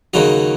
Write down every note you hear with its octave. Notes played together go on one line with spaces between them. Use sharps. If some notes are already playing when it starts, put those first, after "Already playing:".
D#2 C#3 F#3 D#4